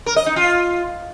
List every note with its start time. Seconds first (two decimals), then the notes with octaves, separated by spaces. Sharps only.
0.06 A#4
0.16 D#5
0.26 D#4
0.36 F4